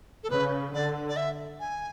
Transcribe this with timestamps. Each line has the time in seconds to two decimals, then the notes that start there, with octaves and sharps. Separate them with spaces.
0.23 A4
0.30 C#3 B4
0.74 D3 D5
1.09 D5
1.16 E5
1.60 G#5